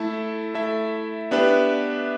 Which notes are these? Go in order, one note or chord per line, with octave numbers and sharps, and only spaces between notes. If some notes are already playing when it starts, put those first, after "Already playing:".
Already playing: A3 E4 A4 E5
A3 E4 A4 E5
B3 D4 G4 B4 E5